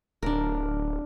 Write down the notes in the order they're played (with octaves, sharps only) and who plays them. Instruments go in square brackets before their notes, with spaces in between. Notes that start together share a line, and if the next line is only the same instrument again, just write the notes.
[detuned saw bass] D1 [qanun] D4 A#4